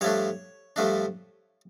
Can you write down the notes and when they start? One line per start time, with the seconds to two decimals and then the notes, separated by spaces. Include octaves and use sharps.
0.01 G2 F3 A3 D4 C#5
0.76 G2 F3 A3 D4